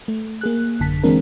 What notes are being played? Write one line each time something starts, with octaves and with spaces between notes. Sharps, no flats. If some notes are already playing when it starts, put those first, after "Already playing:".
A3
A#3 G#4 F#6
A1 F#2 D3 A5 B6
E3 G#3 A#3 C4 D4 A#4